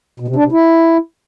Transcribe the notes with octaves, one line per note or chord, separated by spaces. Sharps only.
B2
C3
D4
C3
E4